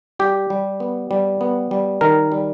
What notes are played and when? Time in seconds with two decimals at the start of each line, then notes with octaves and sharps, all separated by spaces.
0.19 G3 G4
0.50 G3
0.80 B3
1.11 G3
1.41 B3
1.71 G3
2.01 D#3 A#4
2.32 G3